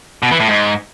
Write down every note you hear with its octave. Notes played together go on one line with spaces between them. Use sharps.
B2
E3
A2
G#2